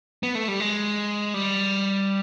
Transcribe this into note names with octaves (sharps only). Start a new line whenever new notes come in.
B3
A3
G3
G#3
G3